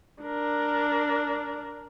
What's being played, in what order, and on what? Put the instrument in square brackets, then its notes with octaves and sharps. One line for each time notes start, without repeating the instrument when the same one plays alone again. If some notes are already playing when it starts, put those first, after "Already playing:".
[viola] D4 A#4